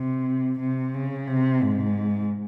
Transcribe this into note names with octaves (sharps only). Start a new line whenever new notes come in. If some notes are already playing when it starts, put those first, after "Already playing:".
Already playing: C3
C3
C#3
C3
G#2